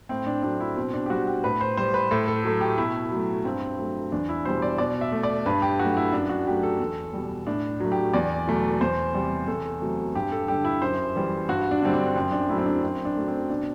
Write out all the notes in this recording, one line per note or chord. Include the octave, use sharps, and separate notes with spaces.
A2 C4
D4
F#3 A3 D4
E4
B2 C4
D4
G4
G3 F#4
G4
A2 B4
C5
G3 C5
B4
A2 A4
A4
F#3 A3
G4
B2 E4
F#3 A3
G2 C4
F#3 A3
E2 D4
E4
B2 G3 C5
D5
B2 D5
E5
A3
D5
G2 B4
G4
F#3 A3 F#4
E4
F#2 D4
F#4
F#3 A3 G4
A4
E2
B2 G3
A2 D4
F#3 A3
G4
E2 D5
B2 F#3 A3
E2 C5
C3 G3
E2 A4
C3 F#3 A3
G2 G4
A4
D3 G3 G4
E4
F#2 C5
E3 G3
G2 F#4
D4
D3 G3 C4
D4
F#2 C4
D4
F#3 A3 E4
C4
D4
F#2 C4
D4
F#3 A3
C4
B2 D4